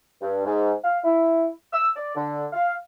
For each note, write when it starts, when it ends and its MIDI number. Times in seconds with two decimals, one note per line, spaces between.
0.21 0.45 43
0.45 0.72 44
0.83 0.97 77
1.04 1.48 64
1.72 1.88 88
1.95 2.15 74
2.15 2.46 50
2.53 2.74 77